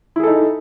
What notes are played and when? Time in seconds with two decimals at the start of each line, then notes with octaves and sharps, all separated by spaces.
0.16 E4
0.20 G#4
0.23 A4
0.27 D#4